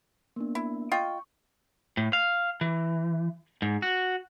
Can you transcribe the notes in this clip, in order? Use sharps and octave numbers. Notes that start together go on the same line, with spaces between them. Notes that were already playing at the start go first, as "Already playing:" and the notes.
A#3 B3 D4
E4
F4 D#5 G5 C#6
A2
F5
E3
G#2
F#4